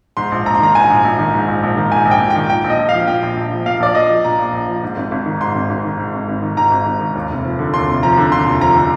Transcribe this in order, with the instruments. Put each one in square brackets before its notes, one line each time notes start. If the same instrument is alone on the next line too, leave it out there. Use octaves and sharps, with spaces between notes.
[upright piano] G#2 C6
A#1
A#1 A#5
C6
D#3 A#5
G#2 G#5
A#1
A#1
D#3
G#2
A#1
A#1
D#3
G#2 G#5
A#1
G5
A#1
D#3 G5
A#2 G5
A#1
D#5
A#1
F3 F5
A#2 G5
A#1
A#1
F3
A#2 F5
A#1 D5
A#1 D#5
F3
A#2 A#5
A#1
A#1
F3
G#2
G#1
G#1
D#3
G#2 C6
G#1
G#1
D#3
G#2
G#1
G#1
D#3
G#2 A#5
G#1
G#1
D#3
D#2
F1
F3
D3
D#2 C6
F1
F3 A#5
D3
D#2 C6
F1
F3 A#5
D3